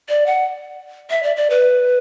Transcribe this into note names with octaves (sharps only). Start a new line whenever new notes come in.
D5
F#5
E5
D5
D5
B4